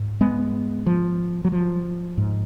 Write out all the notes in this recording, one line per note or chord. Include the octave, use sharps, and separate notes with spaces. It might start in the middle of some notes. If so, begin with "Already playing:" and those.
Already playing: G#2
G#3 B3
F3
F#3
F3
G#2